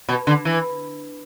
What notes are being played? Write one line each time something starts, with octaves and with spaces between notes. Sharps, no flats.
B2
D3
E3